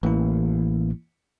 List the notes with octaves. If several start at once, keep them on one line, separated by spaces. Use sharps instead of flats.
A1 E3 A#3 E4